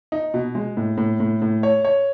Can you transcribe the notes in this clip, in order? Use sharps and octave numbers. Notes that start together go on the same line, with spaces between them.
D#4
B2
G#3
A2
A2
A2
A2
C#5
C#5